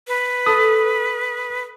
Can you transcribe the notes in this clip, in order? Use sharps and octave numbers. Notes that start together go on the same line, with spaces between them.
B4
A4 D#6